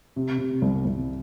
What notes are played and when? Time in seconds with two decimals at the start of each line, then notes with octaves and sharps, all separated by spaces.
0.16 C3
0.38 C3
0.62 C2
0.85 C2